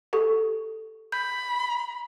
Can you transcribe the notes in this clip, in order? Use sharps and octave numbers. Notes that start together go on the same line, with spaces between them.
G4 A4 C#6
B5 G6